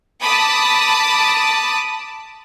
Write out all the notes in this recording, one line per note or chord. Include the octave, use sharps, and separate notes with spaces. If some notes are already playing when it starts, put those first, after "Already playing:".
A5 B5 D6 D#6